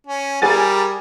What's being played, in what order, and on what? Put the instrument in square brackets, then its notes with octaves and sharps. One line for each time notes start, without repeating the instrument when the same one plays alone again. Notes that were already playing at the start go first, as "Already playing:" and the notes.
[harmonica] C#4
[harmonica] G3 A#4 [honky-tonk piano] G#4 G#5 A6